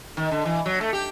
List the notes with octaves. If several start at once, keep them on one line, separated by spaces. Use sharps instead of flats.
D#3
D3
E3
F#3
A3
G4